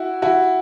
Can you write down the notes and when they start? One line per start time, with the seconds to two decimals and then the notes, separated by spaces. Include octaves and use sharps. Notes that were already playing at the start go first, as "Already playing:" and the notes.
Already playing: E4 F#4
0.22 E4 F#4